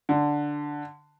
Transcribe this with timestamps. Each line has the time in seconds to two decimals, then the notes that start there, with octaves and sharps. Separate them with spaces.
0.09 D3